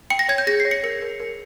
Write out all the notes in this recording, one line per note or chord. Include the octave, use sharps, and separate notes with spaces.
G5 C#7
A#6
C#5 G#6
G6
G#4 A#6
C7
C#5
C#7
A#4 C#7
A#4
A#4